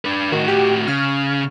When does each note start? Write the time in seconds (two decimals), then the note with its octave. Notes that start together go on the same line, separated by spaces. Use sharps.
0.05 D4 B4
0.32 A2 D#3 F#4
0.48 G4
0.88 C#3 F6